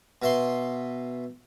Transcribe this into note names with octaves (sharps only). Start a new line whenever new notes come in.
B2 E5 C6